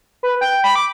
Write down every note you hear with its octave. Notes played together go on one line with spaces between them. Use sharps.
B4
G5
B5
D6